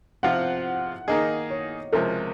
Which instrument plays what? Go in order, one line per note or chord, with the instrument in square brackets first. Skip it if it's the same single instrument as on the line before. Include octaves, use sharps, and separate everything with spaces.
[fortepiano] C3 F3 C4 F4 [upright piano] F#5
[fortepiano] D#3 A#3 D#4 G#4 [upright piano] D#5
[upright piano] C#5
[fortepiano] C#2 C3 F3 [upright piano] A#4